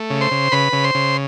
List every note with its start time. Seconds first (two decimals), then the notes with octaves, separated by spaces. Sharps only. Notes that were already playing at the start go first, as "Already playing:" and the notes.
Already playing: A3
0.10 C#3
0.21 C5 C6
0.31 C#3
0.52 C#3 B4 B5
0.73 C#3
0.84 C5 C6
0.95 C#3